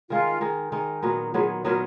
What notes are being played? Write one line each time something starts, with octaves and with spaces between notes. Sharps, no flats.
D#3 G#3 D#4 F4
D#3 G#3 D#4
D#3 G#3 D#4
A#2 F#3 B3 D#4
A#2 F#3 B3 D#4 G#4
A#2 F#3 B3 D#4 A#4